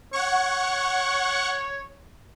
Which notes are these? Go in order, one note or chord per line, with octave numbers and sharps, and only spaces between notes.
C#5 F#5 C#6